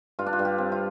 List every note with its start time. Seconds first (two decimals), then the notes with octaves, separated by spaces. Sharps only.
0.19 G2 F4
0.26 D4
0.33 F4
0.39 G2
0.45 G4
0.58 C4
0.72 F4